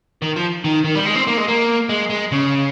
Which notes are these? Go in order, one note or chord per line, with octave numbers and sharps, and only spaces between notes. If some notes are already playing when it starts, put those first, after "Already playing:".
D#3
F3
D#3
D#3
G3
G#3
C4
A#3
G#3
A#3
G#3
G#3
C#3